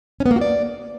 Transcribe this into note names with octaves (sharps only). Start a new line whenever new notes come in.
C#4
B3
A#3
F#4
D5